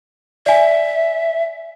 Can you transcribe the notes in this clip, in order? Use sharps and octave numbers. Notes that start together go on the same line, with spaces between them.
D5 E5 G#5